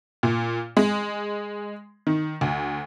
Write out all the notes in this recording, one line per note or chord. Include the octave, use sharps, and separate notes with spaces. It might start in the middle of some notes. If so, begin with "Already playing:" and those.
A#2
G#3
D#3
D2